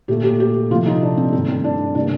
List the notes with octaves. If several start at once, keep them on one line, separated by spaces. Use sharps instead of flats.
A#2 A3 G4
G4
G4
C3 F3 A3 F4
D#4
D4
C4
G2 D#3 A3 C4
C4
D4
C3 G3 A#3 D4